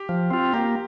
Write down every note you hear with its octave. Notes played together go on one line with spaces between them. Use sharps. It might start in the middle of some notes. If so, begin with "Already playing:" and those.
Already playing: G4
F3
C4 F4
A#3 G4